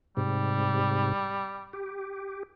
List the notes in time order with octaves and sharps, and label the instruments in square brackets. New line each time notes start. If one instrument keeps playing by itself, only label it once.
[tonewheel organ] G#2 C3 [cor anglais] G3
[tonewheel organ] G4